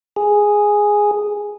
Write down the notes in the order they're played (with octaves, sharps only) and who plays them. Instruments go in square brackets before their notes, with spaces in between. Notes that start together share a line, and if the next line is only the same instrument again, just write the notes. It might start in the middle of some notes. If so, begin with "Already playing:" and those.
[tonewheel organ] G#4